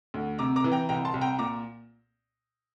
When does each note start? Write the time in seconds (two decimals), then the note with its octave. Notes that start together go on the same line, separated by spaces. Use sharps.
0.14 D2
0.39 C3 A#5 D6
0.56 A#5 D6
0.64 E3
0.72 G5 A#5
0.89 C2 G5 A#5
1.05 A5 C6
1.14 C2
1.21 G5 A#5
1.39 A#2 A#5 D6